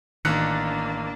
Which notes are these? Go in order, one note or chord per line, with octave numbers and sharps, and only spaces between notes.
A1 D#3 A#3 D4 F#6 C#7